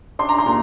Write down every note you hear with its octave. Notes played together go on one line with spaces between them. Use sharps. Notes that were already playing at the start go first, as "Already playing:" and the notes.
D4 C6
A#5
C6
A#2